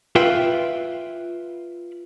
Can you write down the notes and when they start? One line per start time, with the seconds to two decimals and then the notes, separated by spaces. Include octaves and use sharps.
0.15 F4 B4 E5 G5